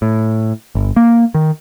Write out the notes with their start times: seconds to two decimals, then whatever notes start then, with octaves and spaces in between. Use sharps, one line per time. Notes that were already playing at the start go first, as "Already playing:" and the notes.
0.02 A2
0.75 G1
0.96 A#3
1.34 D#3